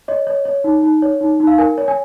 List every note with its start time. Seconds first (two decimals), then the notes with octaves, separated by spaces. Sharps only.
0.08 C#5 D#5
0.27 C#5
0.45 C#5
0.64 D#4
0.83 D#4
1.02 C#5
1.21 D#4
1.40 D#4
1.47 F5
1.58 A#4 G#5
1.78 C#5
1.88 G#5